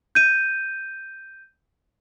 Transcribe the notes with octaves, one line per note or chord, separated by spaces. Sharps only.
G6 D#7